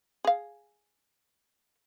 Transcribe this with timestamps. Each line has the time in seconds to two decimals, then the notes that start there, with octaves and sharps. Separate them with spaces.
0.25 G#4 F5